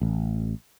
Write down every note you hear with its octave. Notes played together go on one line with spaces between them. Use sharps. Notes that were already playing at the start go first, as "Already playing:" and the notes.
A1